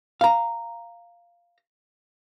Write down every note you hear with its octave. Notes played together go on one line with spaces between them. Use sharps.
F5 A#5